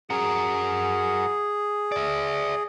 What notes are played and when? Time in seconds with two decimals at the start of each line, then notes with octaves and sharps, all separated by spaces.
0.10 F#4 G#4 A#4
1.92 D5 E5